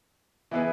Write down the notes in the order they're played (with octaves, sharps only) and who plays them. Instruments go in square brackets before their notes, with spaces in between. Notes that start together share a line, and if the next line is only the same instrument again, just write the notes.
[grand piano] E3 B3 E4 G#4 B4